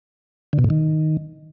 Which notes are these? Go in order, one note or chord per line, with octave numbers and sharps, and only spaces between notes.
D3
B2
A2
D#3